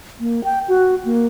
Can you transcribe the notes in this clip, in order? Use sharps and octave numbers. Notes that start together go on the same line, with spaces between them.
A#3
G5
F#4
A#3